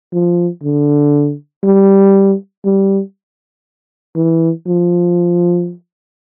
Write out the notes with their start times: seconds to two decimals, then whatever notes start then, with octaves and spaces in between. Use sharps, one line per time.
0.13 F3
0.63 D3
1.63 G3
2.65 G3
4.15 E3
4.67 F3